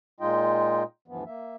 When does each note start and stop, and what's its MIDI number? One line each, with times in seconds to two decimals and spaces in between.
0.20 0.83 46
0.20 0.83 56
0.20 0.83 63
0.20 0.83 65
0.20 0.83 75
0.20 0.83 79
1.08 1.24 38
1.08 1.24 43
1.08 1.24 52
1.08 1.24 53
1.08 1.24 59
1.26 1.56 58
1.26 1.56 76